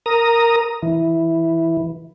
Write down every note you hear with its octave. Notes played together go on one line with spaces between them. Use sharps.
A#4 A#5 D#6
E3